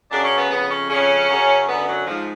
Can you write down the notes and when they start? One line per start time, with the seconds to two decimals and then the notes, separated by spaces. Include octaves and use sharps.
0.11 F#2 C#3 D4
0.24 C#4
0.38 B3
0.50 F2 C#3 B3
0.70 C#4
0.89 F2 C#3 C#4
1.28 F#2 C#3
1.67 F#2 D3 B3
1.88 F#3
2.06 G#2 F3